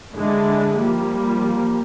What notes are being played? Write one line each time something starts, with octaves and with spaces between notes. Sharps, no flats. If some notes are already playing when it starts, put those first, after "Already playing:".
D3 G#3 D4 E4
F3 G3 A#3